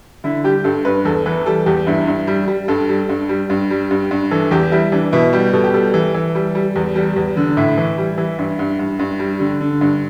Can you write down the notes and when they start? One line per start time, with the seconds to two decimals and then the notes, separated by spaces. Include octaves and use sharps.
0.24 D3 E4
0.44 G3 G4
0.64 G2 A4
0.85 G2 B4
1.05 E2 A4
1.26 E3 B4
1.46 G3 A4
1.66 E2 G4
1.87 G2 E4
2.07 G2
2.27 G3
2.48 G3
2.68 G2 A4
2.89 G3
3.09 G2
3.29 G3
3.50 G2
3.71 G3
3.91 G2
4.11 G2
4.31 E3 A4
4.51 E2 G4
4.72 G3 E4
4.92 E3 D4
5.12 B2 E4
5.33 G3 G4
5.53 B2 A4
5.64 G4
5.74 G3 A4
5.94 E3
6.15 E3
6.35 G3
6.55 G3
6.76 E2
6.96 G3
7.16 E2
7.37 D3
7.57 A2 E4
7.77 E3
7.98 G3
8.18 E3
8.39 G2
8.59 G2
8.79 G2
8.99 G2
9.19 G3
9.40 D3
9.61 D3
9.81 G2